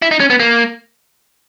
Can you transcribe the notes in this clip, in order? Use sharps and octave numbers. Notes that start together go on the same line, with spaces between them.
E4
D#4
C#4
B3
A#3